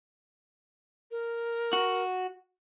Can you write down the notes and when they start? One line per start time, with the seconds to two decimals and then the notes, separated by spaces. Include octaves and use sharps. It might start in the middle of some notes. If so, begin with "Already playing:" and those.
1.11 A#4
1.73 F#4